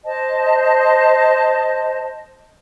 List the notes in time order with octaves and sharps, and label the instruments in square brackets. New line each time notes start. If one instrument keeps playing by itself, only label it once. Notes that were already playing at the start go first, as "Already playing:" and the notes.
[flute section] C5 D#5 A5